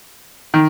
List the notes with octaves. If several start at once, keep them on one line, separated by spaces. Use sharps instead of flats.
D#3